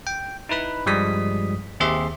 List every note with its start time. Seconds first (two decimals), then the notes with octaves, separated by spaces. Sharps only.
0.07 G5
0.49 D#4 E4 B4 B5
0.86 G2 F3 G3 G#3 D#6 B6
1.80 D#2 C4 G4 G#4 E5 C6